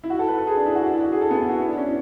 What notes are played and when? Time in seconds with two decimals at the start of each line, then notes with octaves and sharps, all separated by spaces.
0.04 E4
0.10 F#4
0.19 A4
0.28 B4
0.38 A4
0.47 G#4
0.56 D4
0.66 E4
0.76 F#4
0.84 D4
0.94 E4
1.03 F#4
1.12 G#4
1.21 A4
1.30 B3
1.40 E4
1.49 F#4
1.59 E4
1.69 D4
1.78 C#4